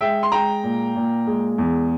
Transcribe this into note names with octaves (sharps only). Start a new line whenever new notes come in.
G#3 E5 G5
C6
G#3 G5 A#5
A#2
A#2
G#3
E2